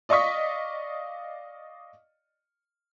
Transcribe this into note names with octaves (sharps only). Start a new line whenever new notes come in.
D5 D#5 F5 C#6 D#6 B6